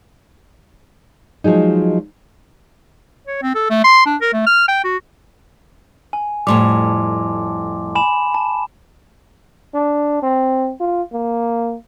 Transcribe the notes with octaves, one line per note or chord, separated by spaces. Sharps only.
F3 F#3 G#3 D#4
C#5
C4
A4
A3
C6
D4
A#4
A3
F6
G5
F#4
G#5
F2 A2 G3 A5 C6 D6
G#5 B5 E7
A5
D4
C4
F4
A#3